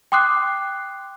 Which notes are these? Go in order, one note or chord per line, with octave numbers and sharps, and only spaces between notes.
G5 C6 D6 D#6 F#6 C7